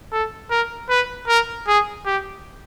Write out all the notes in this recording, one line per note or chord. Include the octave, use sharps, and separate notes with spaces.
A4
A#4
B4
A#4
G#4
G4